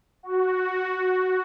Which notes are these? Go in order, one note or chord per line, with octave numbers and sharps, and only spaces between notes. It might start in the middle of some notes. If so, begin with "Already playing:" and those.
F#4